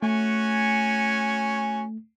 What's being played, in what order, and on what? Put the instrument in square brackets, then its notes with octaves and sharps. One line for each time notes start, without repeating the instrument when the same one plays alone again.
[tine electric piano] A3 [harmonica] C#4 F#4 G#5